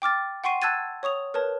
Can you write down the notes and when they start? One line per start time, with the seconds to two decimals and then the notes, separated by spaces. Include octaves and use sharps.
0.02 G5 D6 F6 A6
0.44 F#5 G5 C6 C#6 C7 D#7
0.62 A5 E6 F#6 G#6 A6 D#7
1.03 C#5 C#6 D#6 F7
1.34 A#4 B4 C#5 A5